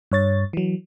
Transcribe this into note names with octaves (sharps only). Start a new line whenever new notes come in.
G2 C#5 A6
E3 F#3